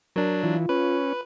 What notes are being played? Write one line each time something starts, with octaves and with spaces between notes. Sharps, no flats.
F#3 D4 A#4
E3 F4
C#4 B4